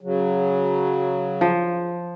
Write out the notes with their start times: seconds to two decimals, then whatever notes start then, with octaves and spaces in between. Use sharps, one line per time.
0.01 C#3 F#3
1.41 F3